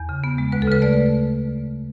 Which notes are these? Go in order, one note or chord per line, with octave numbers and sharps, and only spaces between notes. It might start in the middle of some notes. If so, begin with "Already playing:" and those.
Already playing: E2
C#3
B3
G#3
D2 B4
A4
C#3 B4
A3 D5